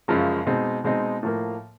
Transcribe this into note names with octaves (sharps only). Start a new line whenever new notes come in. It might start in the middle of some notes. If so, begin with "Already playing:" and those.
F#2 C#3 F3 G#3
B2 G#3 C4 D#4
B2 G#3 C4 D#4
A2 F3 A#3